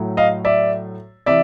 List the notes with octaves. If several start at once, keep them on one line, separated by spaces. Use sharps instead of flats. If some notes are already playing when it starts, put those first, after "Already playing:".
Already playing: A2 F#3 A3
D#5 F5
D5 E5
C3 E3 D5 E5